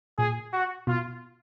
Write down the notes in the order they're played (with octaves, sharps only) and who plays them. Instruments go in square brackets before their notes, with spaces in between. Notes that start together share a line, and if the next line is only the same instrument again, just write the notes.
[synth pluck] A#2 [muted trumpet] G#4
[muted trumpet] F#4
[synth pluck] B2 [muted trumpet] F4